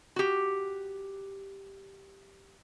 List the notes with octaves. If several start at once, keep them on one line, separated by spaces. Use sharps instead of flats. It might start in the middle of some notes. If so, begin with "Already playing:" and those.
F#4 G4